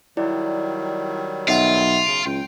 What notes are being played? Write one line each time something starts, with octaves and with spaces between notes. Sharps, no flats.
D#3 F#3 G3 E4 D5
B1 F4 D#5 E5 F#5
C#3 D7
C#2 G5